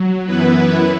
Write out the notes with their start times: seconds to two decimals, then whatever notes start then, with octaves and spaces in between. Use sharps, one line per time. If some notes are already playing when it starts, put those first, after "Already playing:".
Already playing: F#3
0.25 F#2 E3 B3 E4 B4